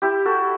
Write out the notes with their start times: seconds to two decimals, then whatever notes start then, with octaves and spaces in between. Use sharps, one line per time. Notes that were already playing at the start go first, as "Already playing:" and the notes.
0.02 E4 G4
0.25 F#4 A4